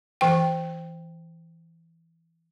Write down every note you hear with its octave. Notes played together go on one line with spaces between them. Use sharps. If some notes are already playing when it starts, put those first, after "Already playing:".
E3 G5